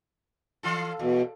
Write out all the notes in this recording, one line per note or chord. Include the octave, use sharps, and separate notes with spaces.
E3 F4 A4
E2 B2